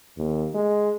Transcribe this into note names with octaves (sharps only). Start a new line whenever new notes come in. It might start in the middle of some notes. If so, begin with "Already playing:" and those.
D#2
G#3